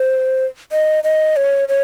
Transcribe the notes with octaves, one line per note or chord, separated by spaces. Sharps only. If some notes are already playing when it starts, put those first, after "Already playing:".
Already playing: C5
D#5
D#5
C#5
C#5